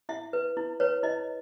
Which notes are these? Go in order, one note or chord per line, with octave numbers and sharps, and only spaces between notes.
E4 E5
B4
E4
B4 C#5
E4 D#5